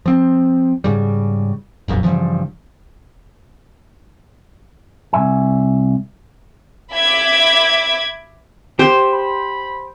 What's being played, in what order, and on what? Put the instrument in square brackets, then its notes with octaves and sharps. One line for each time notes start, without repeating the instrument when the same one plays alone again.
[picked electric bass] F3 C4
G#2 C#3 G3
E1 A#1 F#2
G2 C#3 E3 F3
[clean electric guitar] C2 F2 E5 G#5
[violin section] E5 B5 D6 G#6
[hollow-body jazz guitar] G4 [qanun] C5
[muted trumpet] B5